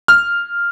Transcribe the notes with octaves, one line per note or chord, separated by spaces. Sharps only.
F6